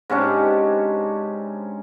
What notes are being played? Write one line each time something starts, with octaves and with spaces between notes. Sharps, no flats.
G#2 C3 C#4 D4